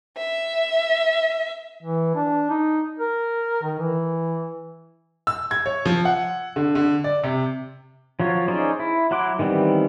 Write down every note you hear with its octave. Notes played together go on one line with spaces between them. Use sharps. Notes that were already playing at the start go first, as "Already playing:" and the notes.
E5
E3
D4
D#4
A#4
D#3
E3
E6
G#6
C#5
F3
F#5
D3
D3
D5
C3
F3 F#3 F4 C#5
C#4 D#4 G#4 C5 D5
E4
F#3 E4 F#5 C6 D6
D#3 E3 G3 B3 C4